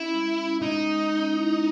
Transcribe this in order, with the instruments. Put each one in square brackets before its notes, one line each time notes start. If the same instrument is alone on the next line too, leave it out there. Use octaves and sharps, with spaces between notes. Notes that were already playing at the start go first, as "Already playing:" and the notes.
Already playing: [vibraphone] C#4 [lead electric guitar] E4
[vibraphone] G#3
C#4
[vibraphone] G#3 [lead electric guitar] D#4
[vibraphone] G#3
C#4
E4